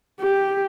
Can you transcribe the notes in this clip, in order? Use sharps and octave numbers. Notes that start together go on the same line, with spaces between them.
G4